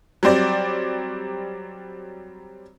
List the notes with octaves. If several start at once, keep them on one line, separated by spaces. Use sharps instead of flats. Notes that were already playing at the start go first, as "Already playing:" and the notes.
F#3 G3 C4 D5